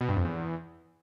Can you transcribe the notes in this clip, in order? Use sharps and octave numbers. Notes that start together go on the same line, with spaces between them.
B2
G2
F2
E2